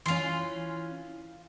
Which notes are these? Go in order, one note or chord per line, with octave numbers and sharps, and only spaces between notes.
E3 C#4 F4 C6